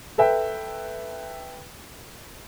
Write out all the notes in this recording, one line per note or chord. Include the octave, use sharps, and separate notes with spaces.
A4 B4 E5 G5